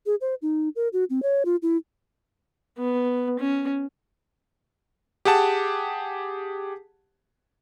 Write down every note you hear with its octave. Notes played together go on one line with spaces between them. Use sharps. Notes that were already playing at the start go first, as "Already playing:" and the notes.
G#4
C5
D#4
A#4
F#4
C4
C#5
F4
E4
B3
C#4
G4 G#4 F#5 A5